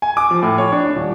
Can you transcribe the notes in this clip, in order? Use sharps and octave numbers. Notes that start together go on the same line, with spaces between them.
G#5
D6
F3
A2
C#5
D4
D#1